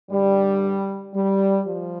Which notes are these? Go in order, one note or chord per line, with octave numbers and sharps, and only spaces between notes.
G2 D3 G3
G3
F3